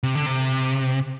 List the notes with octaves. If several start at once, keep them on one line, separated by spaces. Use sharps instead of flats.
C3
D3
C3